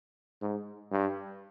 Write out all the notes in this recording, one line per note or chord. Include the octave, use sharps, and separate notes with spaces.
G#2
G2